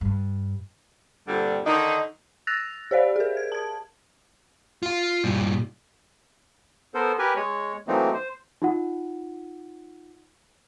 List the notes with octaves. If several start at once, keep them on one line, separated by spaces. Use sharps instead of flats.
G2
G2 A#2 D3 G3 C4
D3 D#3 D4 D#4
E6 F#6 A6 A#6 F7
G4 C5 D5 F5
G#4 A#4
G#6
A5 G#6
F4 F5
G2 A#2
B3 A4 A#4 C5
G4 A#4 B4 G#5
G#3 C#5
E3 F#3 A3 A#3 C4 D#4
C5
D#4 F4 F#5